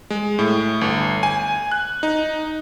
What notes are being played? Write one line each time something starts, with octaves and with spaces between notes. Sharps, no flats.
G#3
A2
G1
G#5
F#6
D#4